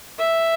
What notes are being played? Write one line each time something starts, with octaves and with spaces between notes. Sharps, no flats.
E5